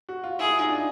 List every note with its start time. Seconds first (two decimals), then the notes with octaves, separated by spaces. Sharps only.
0.09 F#4
0.24 F4
0.39 E4 G#4
0.49 E4
0.59 D#4
0.69 D4